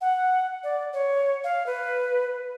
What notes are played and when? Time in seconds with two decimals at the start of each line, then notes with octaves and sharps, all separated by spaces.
0.01 F#5
0.63 D5
0.93 C#5
1.44 F5
1.66 B4